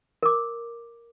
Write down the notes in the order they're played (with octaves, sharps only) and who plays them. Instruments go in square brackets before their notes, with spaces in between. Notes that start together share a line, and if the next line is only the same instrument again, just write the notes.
[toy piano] A#4 D6